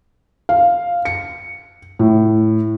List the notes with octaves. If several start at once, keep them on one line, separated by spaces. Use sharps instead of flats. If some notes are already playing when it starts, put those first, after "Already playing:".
F5
C#7
A2